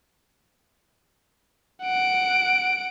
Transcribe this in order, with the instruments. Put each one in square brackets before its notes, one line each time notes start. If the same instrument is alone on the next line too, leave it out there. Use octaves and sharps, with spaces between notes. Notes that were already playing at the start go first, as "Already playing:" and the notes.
[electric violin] F#5 D7